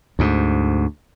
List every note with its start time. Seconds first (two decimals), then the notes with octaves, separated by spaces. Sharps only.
0.19 D2 G#2